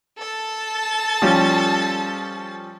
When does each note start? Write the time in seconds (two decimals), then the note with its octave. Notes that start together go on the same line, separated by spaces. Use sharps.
0.18 A4 A5
1.22 F3 G3 C#4